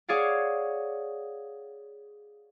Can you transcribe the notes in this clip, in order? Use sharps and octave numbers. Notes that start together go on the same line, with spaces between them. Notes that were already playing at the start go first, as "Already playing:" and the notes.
G#4 C#5 D5 F5 F#5